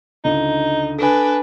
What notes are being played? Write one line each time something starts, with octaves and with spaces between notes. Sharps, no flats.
C#2 D3 D#4
D4 A4 B4 G#5